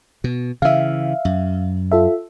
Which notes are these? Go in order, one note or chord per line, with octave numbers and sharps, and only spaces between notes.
B2
C#3 E3 E5 F5
F#2
F4 A4 E5